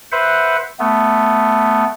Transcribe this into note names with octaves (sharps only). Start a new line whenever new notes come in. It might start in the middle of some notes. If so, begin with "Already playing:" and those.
B4 C5 E5 F#5
A3 B3